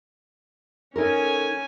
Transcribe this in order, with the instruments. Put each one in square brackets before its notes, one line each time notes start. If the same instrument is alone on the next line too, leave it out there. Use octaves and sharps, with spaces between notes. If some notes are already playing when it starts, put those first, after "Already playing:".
[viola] C#4 G#5 [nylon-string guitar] D#4 A4 A#4